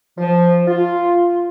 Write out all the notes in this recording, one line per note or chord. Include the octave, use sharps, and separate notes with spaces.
F3
F4